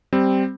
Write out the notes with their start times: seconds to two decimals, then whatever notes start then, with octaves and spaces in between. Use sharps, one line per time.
0.13 G3 C4